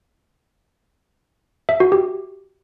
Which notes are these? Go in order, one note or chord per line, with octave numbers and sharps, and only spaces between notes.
E5
F#4
G4